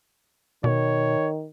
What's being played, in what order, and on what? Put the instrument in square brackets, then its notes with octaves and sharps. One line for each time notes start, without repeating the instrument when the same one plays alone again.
[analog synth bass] B2 [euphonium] D#3 [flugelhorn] C#5